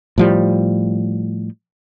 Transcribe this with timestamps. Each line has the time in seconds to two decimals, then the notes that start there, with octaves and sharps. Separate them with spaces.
0.18 A2 F3 G3